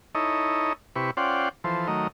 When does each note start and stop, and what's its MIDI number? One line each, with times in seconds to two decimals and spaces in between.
0.15 0.73 63
0.15 0.73 64
0.15 0.73 69
0.15 0.73 73
0.15 0.73 75
0.96 1.11 48
0.96 1.11 64
0.96 1.11 67
0.96 1.11 71
0.96 1.11 85
1.17 1.49 61
1.17 1.49 65
1.17 1.49 72
1.17 1.49 74
1.17 1.49 78
1.17 1.49 79
1.64 1.87 52
1.64 1.87 53
1.64 1.87 69
1.64 1.87 72
1.88 2.08 51
1.88 2.08 54
1.88 2.08 57
1.88 2.08 70
1.88 2.08 75